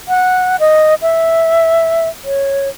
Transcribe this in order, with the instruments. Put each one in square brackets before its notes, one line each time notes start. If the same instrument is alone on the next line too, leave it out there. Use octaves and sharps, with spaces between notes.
[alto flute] F#5
D#5
E5
C#5